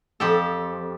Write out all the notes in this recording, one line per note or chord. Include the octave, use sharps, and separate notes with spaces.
F2 G4 A4